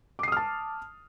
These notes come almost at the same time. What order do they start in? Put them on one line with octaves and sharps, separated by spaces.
D6 C7 D#6 F6 A5